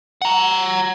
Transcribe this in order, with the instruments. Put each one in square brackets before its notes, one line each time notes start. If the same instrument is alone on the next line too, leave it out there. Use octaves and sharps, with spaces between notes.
[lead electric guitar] F#5 A#5